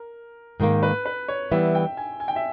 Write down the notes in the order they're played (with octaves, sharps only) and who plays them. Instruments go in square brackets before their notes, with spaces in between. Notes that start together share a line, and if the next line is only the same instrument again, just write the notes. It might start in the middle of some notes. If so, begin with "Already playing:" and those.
Already playing: [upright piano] A#4
[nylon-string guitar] G#2 D#3 A#3
[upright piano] B4
B4
C#5
[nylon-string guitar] E3 G3 B3 [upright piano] E5
[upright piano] G5
G#5
G#5
G5
E5